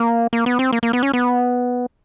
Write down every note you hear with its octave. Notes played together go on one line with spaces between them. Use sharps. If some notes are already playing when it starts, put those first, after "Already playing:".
Already playing: A#3
A#3
B3
C4
A#3
A#3
B3
C#4
B3